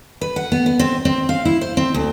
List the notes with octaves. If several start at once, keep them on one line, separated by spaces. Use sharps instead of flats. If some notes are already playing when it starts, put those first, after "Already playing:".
B4
F#5
B3
B3
C4
C4
F5
E4
C5
C4
D2